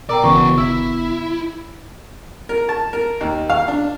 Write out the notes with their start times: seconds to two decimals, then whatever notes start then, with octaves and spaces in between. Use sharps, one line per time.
0.09 B2 A#4 D5 G5 A#5 D6 E6
0.24 G1 C#3 E3 B3 F#4 C#6
0.58 E4 E6
2.49 A#4
2.69 A5
2.93 A#4
3.21 D#2
3.50 F5
3.68 D4